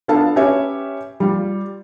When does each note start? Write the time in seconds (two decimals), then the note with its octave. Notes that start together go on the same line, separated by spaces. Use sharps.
0.08 B3 D4 F4 A4 F5 A5
0.36 C#4 G4 B4 C#5 E5
1.20 G3 F4